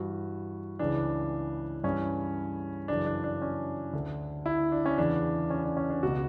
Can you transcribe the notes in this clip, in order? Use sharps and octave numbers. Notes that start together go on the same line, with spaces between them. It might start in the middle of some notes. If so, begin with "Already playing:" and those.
Already playing: G2 E3 F#4
C#2 C#3 E3 D4
G2 E3 C#4
F#2 C#3 E3 D4
D4
D4
C#4
D2 D3
E4
D4
C#4
E2 C#3 E3 D4
C#4
D4
C#4
D4
C#2 B2 F#4